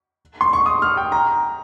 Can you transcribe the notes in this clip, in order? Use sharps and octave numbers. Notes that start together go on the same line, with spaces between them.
C6
C#6
D#6
F6
G5
A#5